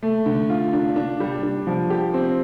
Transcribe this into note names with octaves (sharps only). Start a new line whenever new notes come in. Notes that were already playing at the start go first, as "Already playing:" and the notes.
A3
D3
F4
D4
D4
G3
D4
F3
G4
C4